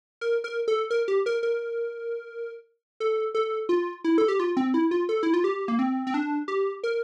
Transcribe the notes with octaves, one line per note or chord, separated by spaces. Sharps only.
A#4
A#4
A4
A#4
G4
A#4
A#4
A4
A4
F4
E4
A4
G4
F4
C4
E4
F4
A4
E4
F4
G4
A#3
C4
C4
D4
G4
A#4